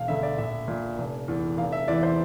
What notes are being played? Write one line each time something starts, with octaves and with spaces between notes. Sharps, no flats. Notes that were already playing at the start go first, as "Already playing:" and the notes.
Already playing: E1 F5
D2 D3 E5
D5
A#1 E5
A#2
F1
E2 E3
F1 F5
E5
E2 E3 D5
C5